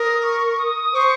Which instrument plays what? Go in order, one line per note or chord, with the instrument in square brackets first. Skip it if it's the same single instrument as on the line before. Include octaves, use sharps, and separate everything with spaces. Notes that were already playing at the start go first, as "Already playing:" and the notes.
Already playing: [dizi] A#4 [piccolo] D#6
[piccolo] C#6
D#6
[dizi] C5 [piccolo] C#6